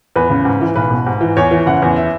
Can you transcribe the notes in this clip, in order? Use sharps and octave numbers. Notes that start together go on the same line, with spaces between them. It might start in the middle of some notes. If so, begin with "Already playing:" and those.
E2 B4
C#3
G#2
E3
B1 B4
B2
G#2
E3
E2 C#5
E3
F#1 F#5
E2
E5